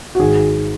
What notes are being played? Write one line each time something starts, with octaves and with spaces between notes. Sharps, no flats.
F#4
G#1 G#4